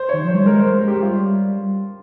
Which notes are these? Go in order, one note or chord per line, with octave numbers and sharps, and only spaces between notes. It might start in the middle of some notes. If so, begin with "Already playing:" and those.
Already playing: C5
D#3 C#5
F3 C5
G3
G#3 A#4
C5
G#3 A#4
G4
G#3
G3 F4